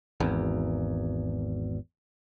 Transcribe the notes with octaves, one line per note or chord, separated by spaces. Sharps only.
G#1 E2